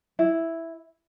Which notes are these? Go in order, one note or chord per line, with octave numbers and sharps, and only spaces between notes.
E4